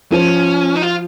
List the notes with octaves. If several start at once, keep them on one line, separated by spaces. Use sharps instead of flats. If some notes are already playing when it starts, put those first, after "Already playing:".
F3 C#4
D#4
F4